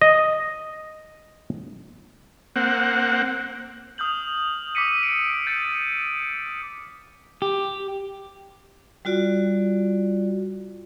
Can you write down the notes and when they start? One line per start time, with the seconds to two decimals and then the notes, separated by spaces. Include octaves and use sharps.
0.02 D#5
2.56 A#3 C4 F#5
3.98 D#6 F6 G6 F#7
4.75 D6 E6 B6 C#7 D#7
5.03 D7
5.47 G6 A6 C#7
7.42 G4
9.05 G3 F4 F#4 D5